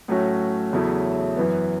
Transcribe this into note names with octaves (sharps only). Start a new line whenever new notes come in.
A2 F#3 A3 C#4 F#4
E2 C#3 F#3 A3 E4
F#2 E3 B3